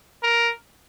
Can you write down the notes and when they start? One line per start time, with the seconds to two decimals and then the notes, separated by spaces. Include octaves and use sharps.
0.23 A#4